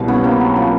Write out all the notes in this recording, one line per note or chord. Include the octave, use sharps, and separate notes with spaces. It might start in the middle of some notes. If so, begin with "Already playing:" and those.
Already playing: C2 B2 G3
B3 C#4
A#3 C4
F#3
F3